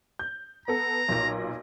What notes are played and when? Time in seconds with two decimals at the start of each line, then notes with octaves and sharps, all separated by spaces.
0.19 G6
0.68 B3 A4 A#5
1.09 B1 A#2 A#6